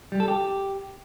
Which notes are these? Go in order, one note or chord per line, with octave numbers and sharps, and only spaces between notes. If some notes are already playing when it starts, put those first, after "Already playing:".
G3
A4
G4